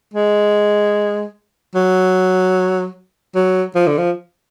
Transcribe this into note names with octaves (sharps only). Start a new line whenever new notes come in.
G#3
F#3
F#3
F3
D3
F3